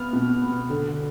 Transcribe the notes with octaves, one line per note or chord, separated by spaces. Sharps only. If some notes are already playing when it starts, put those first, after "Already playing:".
Already playing: B3 F6
B2
B3
D3